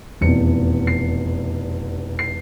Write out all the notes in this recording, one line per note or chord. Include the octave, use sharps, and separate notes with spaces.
F1 E2 B2 C#7
C7
C7